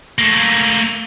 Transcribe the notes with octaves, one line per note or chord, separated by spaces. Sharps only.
A3 A#3